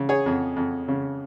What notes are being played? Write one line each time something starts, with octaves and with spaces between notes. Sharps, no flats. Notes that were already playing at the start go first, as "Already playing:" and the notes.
Already playing: C#3
G#4 C#5
F2
F2
C#3